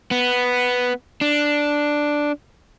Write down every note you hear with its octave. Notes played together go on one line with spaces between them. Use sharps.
B3
D4